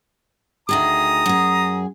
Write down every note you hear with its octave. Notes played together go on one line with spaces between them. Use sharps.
D2 D#3 G#4 A#5 D#6
F#2 G#4